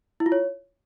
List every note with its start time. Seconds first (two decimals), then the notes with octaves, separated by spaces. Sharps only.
0.20 E4
0.26 F4
0.32 C#5